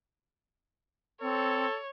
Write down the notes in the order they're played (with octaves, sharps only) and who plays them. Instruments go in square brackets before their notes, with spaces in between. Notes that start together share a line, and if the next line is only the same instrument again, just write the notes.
[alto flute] C4 [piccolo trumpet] A4 [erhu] C#5